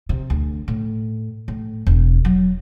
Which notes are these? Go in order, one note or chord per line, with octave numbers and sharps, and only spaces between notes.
C3
D2
A2
A2
E1
F#3